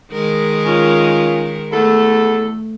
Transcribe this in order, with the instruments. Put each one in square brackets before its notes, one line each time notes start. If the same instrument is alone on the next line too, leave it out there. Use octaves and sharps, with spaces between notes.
[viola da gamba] D#3 G#3 A#4
[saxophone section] C#4 F4
[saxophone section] E2 A4 [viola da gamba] A3